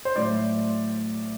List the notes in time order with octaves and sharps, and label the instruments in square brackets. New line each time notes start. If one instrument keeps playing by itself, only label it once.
[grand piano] C5
A2 F#3 A3 D5